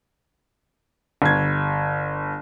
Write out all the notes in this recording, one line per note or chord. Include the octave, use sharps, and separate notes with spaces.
G1 G#6